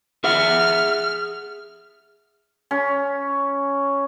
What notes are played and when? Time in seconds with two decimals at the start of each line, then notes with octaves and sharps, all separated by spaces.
0.24 G#4 E5 F#5 F6
2.71 C#4